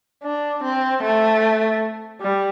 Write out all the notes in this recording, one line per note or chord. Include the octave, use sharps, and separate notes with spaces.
D4
C4
A3
G3